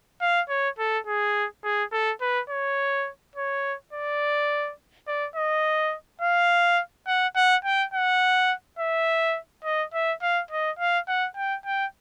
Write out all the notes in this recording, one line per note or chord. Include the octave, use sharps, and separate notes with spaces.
F5
C#5
A4
G#4
G#4
A4
B4
C#5
C#5
D5
D5
D#5
F5
F#5
F#5
G5
F#5
E5
D#5
E5
F5
D#5
F5
F#5
G5
G5